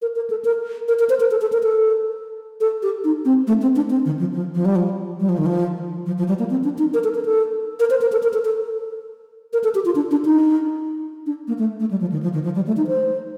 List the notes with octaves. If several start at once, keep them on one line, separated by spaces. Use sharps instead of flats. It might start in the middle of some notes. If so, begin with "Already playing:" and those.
A#4
A#4
A4
A#4
A#4
A#4
C5
A#4
A4
A4
A#4
A4
A4
G4
D#4
C4
A3
C4
D4
C4
D#3
F3
F3
F3
G3
F3
G3
F3
D#3
F3
F3
F3
G3
A#3
C4
D4
D#4
A#4
A4
A#4
A4
A#4
C5
A#4
A4
A#4
A4
A4
A#4
A4
G4
F4
D4
D4
D#4
D4
A#3
A3
A3
G3
F3
D#3
F3
D#3
F3
G3
A3
D#4
C5